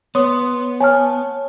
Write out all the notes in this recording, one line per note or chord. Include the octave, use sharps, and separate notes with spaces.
B3 C#5 C6 D#6
C#5 G#5 A5 F6